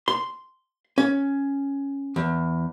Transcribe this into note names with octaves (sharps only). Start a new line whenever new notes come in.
C6
C#4
E2